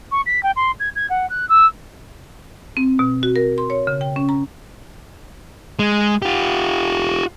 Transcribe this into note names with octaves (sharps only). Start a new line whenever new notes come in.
C#6
B6
G5
C6
G#6
G#6
F#5
F#6
E6
C4
B2
F#4
A#4
C6
C#5
C#3
G5
C#4
A#5
G#3
F4 G4